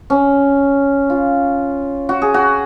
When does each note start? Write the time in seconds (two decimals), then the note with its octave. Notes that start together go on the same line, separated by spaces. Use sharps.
0.10 C#4
1.10 F4
2.09 F#4
2.22 G#4
2.34 F#4